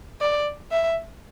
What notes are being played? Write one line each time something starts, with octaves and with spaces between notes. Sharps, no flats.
D5
E5